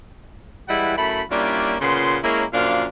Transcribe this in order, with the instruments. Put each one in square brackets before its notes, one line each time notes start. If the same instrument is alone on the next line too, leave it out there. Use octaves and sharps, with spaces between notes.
[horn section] E3 G3 G#3 E4 F#5
F#2 A3 E4 B5
G3 A#3 C#4 D4 E4 F4
A#2 C#3 B3 F4 C6
G#3 A#3 C#4 E4 A#4 C#5
F#2 A#2 F3 D4 F5